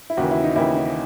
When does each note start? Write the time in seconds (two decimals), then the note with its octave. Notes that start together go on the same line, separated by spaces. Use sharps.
0.10 E4
0.17 D#2 C#3 E3 F#4
0.31 E4
0.44 D#4
0.56 D#2 C#3 E3 E4
0.75 D#4